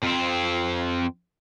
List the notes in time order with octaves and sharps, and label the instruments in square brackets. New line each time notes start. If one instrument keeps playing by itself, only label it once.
[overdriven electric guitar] F2 C4